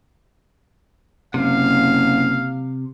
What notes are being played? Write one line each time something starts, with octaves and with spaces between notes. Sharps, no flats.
F#1 C3 F5